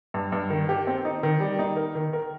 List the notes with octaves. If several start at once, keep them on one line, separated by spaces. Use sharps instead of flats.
G2
G2
D#3
G4
C4
D#4
D#3
G3
D#4
A#4
D#3
A#4